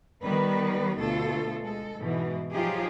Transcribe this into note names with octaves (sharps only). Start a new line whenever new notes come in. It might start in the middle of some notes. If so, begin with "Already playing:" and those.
D#3 G3 B3 B4
D2 B2 F4 A4
G#3 A4
G#2 B2 E3
F3 F#3 D#4 F4 G4 G#4